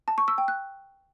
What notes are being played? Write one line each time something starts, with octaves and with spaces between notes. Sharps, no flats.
A5
C#6
E6
G5
F#6